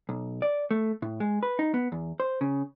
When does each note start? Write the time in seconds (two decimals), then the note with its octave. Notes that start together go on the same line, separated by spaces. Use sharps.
0.09 B1
0.42 D5
0.71 A3
1.02 A2
1.20 G#3
1.43 B4
1.59 D#4
1.74 B3
1.92 E2
2.20 C5
2.41 C#3